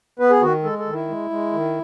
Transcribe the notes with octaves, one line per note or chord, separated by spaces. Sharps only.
B3 B4
G#4
D#3 F#4
G#3 A4
A4
D#3
E4
G#3
G#3
D#3